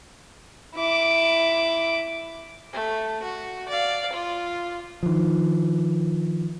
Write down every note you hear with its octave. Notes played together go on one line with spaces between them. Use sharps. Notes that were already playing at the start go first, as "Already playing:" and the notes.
E4 D6
A3
F#4
D5 F5
F4
D#3 F3